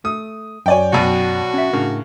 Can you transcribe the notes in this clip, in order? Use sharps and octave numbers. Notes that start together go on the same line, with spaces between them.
A3 D#6
F#2 C#5 D5 G5 G#5
B1 B2 F#4
C#4 E5
A2 C#3 D4 A#4